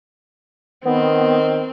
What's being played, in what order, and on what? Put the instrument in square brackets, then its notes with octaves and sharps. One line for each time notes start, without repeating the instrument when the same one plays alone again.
[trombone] D#3 [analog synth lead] B3 [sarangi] C4